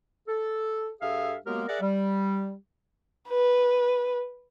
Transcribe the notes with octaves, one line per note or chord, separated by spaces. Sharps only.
A4
G2 G#4 A4 E5 F5
F#3 G#3 A#3 B3 G4 A#4
G#4 A#4 D5 E5 F#5
G3
B4